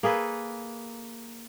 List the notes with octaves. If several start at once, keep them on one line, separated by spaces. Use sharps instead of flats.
A#3 G#4 A4 B4